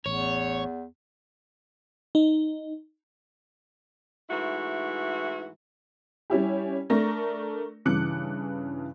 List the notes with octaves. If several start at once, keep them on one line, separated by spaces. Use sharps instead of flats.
A1 E2 C#5
D#4
G#2 E3 A3 E4 F#4
G3 C#4 E4 G4
A3 D4 A#4 C#6 A#6
G2 C#3 E3 D6 F#6 C#7